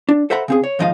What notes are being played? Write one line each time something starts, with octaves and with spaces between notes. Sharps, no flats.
D4
A4 C5 E5 F#5 A#5 B5
C#3 C4 G#4
C#5
D#2 G#2 F3 D#4 D#5 F5